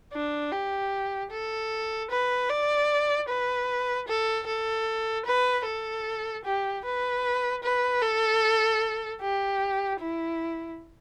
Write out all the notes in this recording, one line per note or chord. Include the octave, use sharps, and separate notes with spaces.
D4
G4
A4
B4
D5
B4
A4
A4
B4
A4
G4
B4
B4
A4
G4
E4